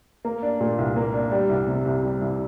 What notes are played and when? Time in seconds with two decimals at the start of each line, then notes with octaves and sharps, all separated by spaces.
0.25 A#3
0.43 D4
0.60 A#2
0.78 C2
0.96 A#3
1.14 D4
1.32 G3
1.49 C2
1.68 C3
1.85 C2
2.03 G3
2.22 C2